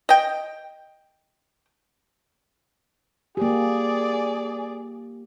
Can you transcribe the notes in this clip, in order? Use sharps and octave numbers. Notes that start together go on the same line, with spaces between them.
D#5 G5
A#3 G4 G#4 D5